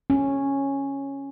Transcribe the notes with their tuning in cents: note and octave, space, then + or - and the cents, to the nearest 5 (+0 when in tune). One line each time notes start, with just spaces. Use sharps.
C#4 -5